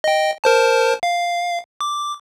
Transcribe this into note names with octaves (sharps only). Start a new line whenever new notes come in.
D#5 G5
A#4 C5 A5
F5
D6